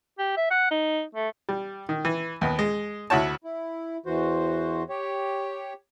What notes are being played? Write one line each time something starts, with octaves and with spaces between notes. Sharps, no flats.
G4
E5
F#5
D#4
A3
G3
D#3
E3
D#2 B3
G#3
D2 E4 F#4 C#5 A5
E4
E2 E3 F#4 C5
G4 C#5